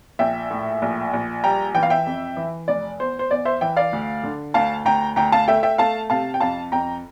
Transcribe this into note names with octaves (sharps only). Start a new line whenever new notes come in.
A#1 E5 G5
A2
A#1
A#1
G3 G5 A#5
E3 G5
F5
E5 G5
F2
E3
F1 D5
E2 C5
C5
E2 D5
C5 E5
E3 E5 G5
D5 F5
D2
D3
D2 F5 A5
D2 G5 A#5
D2 G5 A#5
F5 A5
A3 E5 G5
E5 G5
A3 F5 A5
C3 F5 A5
G5
F2 F5 A5
F2 G5 A#5